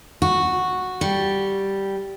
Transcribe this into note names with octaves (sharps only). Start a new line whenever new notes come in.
F#4
G3